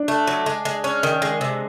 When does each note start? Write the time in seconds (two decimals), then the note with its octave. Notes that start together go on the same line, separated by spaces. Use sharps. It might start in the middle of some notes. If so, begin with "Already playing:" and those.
Already playing: D4
0.08 A3
0.27 F#3
0.46 G#3
0.65 G#3
0.84 C#4
1.03 D#3
1.22 G#3
1.41 C3